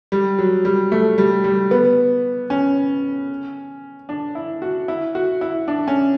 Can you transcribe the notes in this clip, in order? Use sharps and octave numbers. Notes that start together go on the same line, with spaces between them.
G3
F#3
G3
A3
G3
G3
B3
C#4
D4
E4
F#4
E4
F#4
E4
D4
C#4